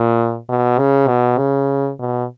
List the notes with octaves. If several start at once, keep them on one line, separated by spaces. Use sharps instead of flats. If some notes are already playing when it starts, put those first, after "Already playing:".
Already playing: A#2
B2
C#3
B2
C#3
B2